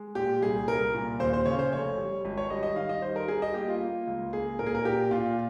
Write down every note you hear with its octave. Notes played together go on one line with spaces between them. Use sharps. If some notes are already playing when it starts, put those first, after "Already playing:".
Already playing: G#3
A#2 G4
C2 G#4
C2 A#4
A#2
D#2 C5
C5
C#3 C#5
C5
F1 C#5
G3
G#1
C#5
G3 D#5
D#5
D#3 F5
D#5
G3 C5
A#4
G3 G#4
D#5
A#3 G4
F4
A#3
C#2
A#3 G#4
A#2 A#4
G#4
A#4
A#2 G4
A#2 F4